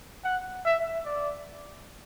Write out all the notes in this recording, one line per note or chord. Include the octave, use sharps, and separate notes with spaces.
F#5
E5
D5